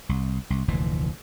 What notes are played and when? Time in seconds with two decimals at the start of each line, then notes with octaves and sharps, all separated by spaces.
0.09 C2
0.50 C2
0.68 F1 D2 A#2 E3